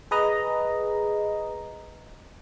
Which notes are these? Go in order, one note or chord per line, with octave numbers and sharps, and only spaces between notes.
G#4 B4 D#5 A#5